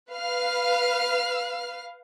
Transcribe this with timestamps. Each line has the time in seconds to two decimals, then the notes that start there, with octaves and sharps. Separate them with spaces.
0.11 B4 F5 F6